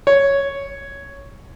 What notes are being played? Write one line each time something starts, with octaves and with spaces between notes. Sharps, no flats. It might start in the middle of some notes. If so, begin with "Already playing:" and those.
C#5